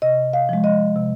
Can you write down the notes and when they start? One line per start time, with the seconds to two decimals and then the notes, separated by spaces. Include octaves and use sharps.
0.02 C3 D#5
0.33 F5
0.49 F3 G#3
0.64 D#5
0.96 C3